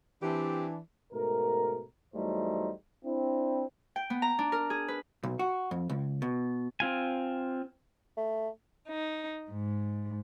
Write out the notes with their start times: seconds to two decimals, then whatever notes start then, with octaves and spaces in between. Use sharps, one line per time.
0.23 E3 C4 D4 G4
1.13 G#2 B2 A3 A#4
2.15 E2 F#3 G3 A3 D#4 C5
3.04 C4 D4 E4
3.96 G5
4.10 B3
4.22 A#5
4.39 D4
4.52 A#4
4.70 G#4
4.88 B4
5.24 B1
5.39 F#4
5.71 F2
5.90 C#2
6.22 B2
6.80 C4 F4 G#5
8.17 A3
8.87 D#4
9.51 G#2